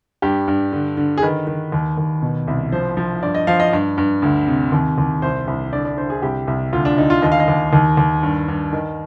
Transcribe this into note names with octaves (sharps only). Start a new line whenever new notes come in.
G2 G4
G2
D3
D3
G#4
D#3 B4
D#3
D#2
D#2
B2
C2
F3 C5
F3
G2 D5
D#5
F3 F5
D#5
G2
G2
D2
C3
D#2
D#2
C2 C5
C2
D3 D5
D5
D3 C5
G#4
C2 G4
C2
D2 F4
D4
D2 D#4
F4
D#2 D#5
F5
D#5
D#2
D#2
D#2
G2
G2
D#3